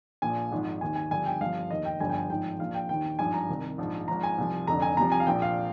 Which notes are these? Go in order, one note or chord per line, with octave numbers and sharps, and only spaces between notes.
A#1 A#2 F3 G#5
G#1 G#2 F3
D#2 D#3 G#5
G#5
G1 G2 D3 F3 G#5
G5
G1 G2 F3 F5
F1 D#2 D#3 D#5
G5
G1 G2 D3 F3 G#5
G5
G#5
G#1 G#2 F3 G5
A#1 A#2 F3 F5
G5
D#2 D#3 G5
G#1 G2 F3 G#5
A#5
C2 C3 D#3
A#1 G#2 F3
G#1 G#2 F3 A#5
G#5
C2 C3 F3
F1 F2 D3 A#5
G#5
C2 C3 F3 A#5
G#5
F5
A#1 A#2 F3 G5
F5